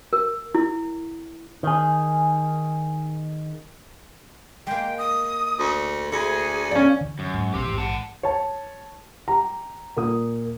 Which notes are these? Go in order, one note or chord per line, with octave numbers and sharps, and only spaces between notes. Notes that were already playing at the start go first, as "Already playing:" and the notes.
A#4
E4
D#3 G#4
G#3 A#3 G5
D#6
D2
D2 E4 G#4
F3 C#4 D5
D3 E3
F#2
G#2
A1 F2 B2 G4 C5
A#1 G#2 E3
F#5 A5
C#5 A5
G4 A#5
A#2 A#3 D#6